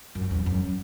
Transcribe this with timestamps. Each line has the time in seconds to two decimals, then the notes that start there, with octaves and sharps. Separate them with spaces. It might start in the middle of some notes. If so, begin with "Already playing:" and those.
0.15 F#2
0.31 E2
0.46 F#2